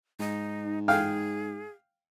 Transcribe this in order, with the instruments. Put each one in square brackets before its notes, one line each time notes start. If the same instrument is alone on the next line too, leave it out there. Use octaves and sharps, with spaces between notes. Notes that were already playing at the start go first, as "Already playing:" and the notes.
[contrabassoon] G#2 [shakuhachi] D#4
[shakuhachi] G#4 [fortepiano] F5 G5 F6